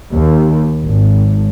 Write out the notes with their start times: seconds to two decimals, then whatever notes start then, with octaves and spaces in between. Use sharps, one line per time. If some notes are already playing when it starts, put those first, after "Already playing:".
0.12 D#2
0.84 G#1